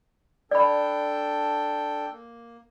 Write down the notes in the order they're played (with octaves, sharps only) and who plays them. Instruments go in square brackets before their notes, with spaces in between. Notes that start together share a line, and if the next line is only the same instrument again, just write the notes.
[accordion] D4 A4 G5 [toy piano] D5 B5
[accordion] A#3